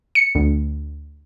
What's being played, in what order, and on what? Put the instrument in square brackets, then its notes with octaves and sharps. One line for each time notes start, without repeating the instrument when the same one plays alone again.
[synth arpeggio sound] C#7
D2